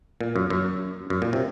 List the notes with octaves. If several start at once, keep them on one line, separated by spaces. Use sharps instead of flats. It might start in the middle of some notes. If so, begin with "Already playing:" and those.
A#2
F#2
F#2
F#2
A#2
C3